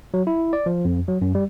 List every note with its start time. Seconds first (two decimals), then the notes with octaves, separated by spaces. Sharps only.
0.14 F#3
0.27 E4
0.53 D5
0.66 F3
0.85 F2
1.08 F#3
1.22 F#2
1.35 G3